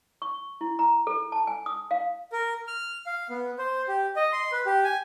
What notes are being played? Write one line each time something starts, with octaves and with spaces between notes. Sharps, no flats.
C#6
E4
A#5
A4
A5
G#5
D#6
F5
A#4
F6
F5
B3
C5
G4
D#5
C6
B4
G4
G#5